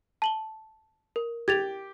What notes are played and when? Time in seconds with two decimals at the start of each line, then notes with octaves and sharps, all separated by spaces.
0.22 A5 F#7 G7
1.16 A#4
1.48 G4 G#6 A6 F7